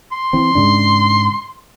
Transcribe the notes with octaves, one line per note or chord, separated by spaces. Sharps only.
C6
E3 C4
G#2 C#3 D4